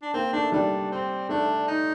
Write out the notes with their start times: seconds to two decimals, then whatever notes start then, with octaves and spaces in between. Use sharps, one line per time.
0.02 D4
0.14 A#3 C4
0.32 A3 D4
0.52 G3 D4
0.92 C4
1.29 A3 D4
1.68 D#4